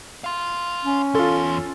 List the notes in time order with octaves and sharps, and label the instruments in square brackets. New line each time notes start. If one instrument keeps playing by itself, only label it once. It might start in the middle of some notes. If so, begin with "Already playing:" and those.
[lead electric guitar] F5 C6
[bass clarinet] C#4
[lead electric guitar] E2 C6 [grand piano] F4 A4